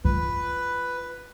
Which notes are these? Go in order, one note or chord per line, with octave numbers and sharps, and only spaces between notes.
F4 B4